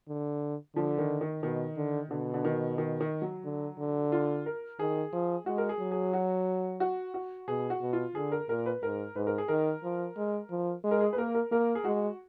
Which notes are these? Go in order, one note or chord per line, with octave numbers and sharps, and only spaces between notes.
D3
D3 F3
D#3
D#3
B2 D#3
D3
B2 D3
D3
D#3
D#3
D#3
F#3
D3
D3
F4
A#4
D#3 G#4
F3
G#3 F#4
A#4
G#4
F#3
G#4
F#4
F#4
F#4
B2 G#4
F#4
B2
F4
D3 G#4
A#4
A#2 A#4
B4
G#2 A#4
G#2 B4
A#4
G#4
D#3 A#4
F3
G#3
F3
G#3
A#4
G#4
B4
A#3 A#4
A#4
A#3 A#4
G#4
G#3 F#4